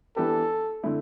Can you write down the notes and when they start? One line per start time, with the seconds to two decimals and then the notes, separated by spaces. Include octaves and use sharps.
0.16 E3 B3 D4 G4 A4 B4
0.83 D3 A3 E4